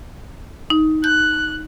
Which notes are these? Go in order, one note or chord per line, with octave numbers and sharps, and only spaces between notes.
D#4
F#6 G6